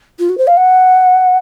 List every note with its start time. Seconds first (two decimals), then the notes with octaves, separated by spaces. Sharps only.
0.19 F4
0.29 F#4
0.38 C5
0.47 F5
0.57 F#5